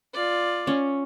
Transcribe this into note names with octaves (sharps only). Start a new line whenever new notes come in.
F4 D5
C#4